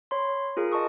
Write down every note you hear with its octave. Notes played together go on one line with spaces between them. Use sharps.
C#5 B5 C6
F4 G#4 A#4
D#5 A5 C#6 D#6